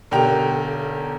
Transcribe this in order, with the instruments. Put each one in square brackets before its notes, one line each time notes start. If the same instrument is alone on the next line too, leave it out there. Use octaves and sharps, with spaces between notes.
[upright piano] B1 D3 G4 A#4 G5 F7